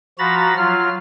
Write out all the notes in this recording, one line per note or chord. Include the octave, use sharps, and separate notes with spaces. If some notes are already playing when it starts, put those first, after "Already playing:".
F3 F#4 A#5 B5 A6
F#3 F4 F6